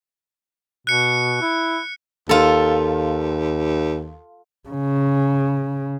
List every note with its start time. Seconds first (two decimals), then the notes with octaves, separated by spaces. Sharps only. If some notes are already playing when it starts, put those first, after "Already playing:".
0.87 B2 F#6 C#7
1.42 E4
2.29 D#2 F4 A4
4.69 C#3